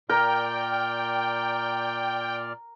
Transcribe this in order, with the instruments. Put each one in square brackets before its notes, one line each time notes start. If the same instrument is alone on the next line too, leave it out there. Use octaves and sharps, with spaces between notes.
[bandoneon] A#2 D5 F6 [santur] A#4 [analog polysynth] G5